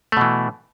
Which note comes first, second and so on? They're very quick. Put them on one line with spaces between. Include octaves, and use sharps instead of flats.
A3 B2 E3